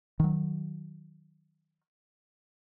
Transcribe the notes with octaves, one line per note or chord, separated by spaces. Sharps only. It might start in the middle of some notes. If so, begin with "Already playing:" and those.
D#3 F#3